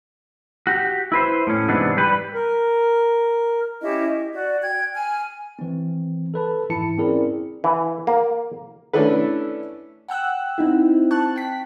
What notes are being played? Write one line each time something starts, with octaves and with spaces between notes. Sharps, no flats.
F#4 G4
E4 B4 C5
A2 C#4
G#2 C3 E3 B3 D4
G3 G4 B4
A#4
C#4 E4 G4 D#5
D#5
F#4 D5
G5 F#6 G#6
G#5 F6
E3 C4
A4 B4 A5
G#2 E3 E4 A5 C#7
C4 C#4 E4 G#4 A#4 D5
E3
A#3
A3 C#4 D4 E4 A4 B4
F#5 G5 E6 F#6
C4 D#4 E4
A5 C#6 F#6
G5 B6